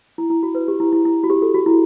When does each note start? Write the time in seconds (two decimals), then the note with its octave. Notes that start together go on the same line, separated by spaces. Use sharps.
0.18 E4
0.30 E4
0.43 F#4
0.55 B4
0.68 G4
0.80 E4
0.93 E4
1.05 E4
1.24 F#4
1.30 G4
1.42 A4
1.54 F#4
1.66 E4